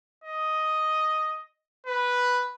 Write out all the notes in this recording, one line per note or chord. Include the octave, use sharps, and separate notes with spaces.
D#5
B4